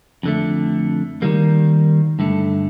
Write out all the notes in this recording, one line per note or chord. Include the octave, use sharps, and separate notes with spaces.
F2 D3 A3
D#3 G3 A#3
G2 D3 A3